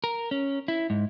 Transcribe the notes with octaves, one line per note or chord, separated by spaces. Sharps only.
A#4
C#4
E4
G#2